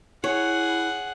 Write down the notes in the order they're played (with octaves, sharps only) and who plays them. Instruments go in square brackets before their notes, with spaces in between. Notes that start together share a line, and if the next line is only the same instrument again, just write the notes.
[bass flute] E4 [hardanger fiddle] G#4 F#5 [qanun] C#5